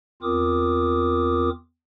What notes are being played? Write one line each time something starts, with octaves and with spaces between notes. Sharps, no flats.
E2 C4 F4 A#4 D6 D#6